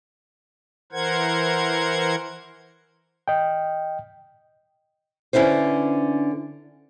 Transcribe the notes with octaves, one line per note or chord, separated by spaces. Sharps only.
E3 A#4 C5 F#5 G#6
D#5 G5
D3 C#4 E4 B4 C5